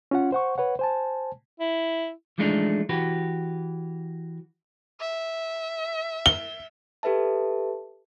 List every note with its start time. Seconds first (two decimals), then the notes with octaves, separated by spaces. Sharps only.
0.11 C#4 F4 F#5
0.32 C5 F#5 C#6
0.58 B4 C#5 F#5
0.79 C5 G#5 A5
1.60 E4
2.38 E3 F3 G#3 A3 D4 D#4
2.89 E3 F#4 G4 B4
5.00 E5
6.26 G7
7.03 G4 A4 B4 E5 A5